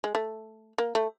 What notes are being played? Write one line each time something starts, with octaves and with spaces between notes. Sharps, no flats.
G#3
A3
A#3
A3